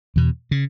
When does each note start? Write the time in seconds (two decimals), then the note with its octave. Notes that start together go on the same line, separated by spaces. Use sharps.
0.16 E2 B2
0.51 C#3